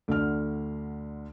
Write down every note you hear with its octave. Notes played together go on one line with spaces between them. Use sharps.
D2 D3 F6